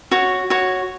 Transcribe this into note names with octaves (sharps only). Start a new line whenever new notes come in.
F#4 C#5
F#4 C#5